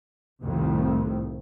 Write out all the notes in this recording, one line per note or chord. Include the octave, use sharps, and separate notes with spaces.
C2 F2 A2 D#3